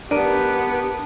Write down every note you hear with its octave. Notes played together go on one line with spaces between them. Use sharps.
B3 D4 G4 A#4 B4 A5 D7